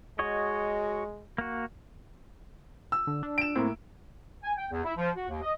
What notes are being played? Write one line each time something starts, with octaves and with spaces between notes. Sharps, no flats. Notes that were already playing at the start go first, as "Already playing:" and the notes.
G#3 F#4 C#5 D#5
A#3 F#4
E6
D3
D4
D7 E7
A2 A#3 C4
G#5
G5
E2
E4
F3
F#4
D#2
D#5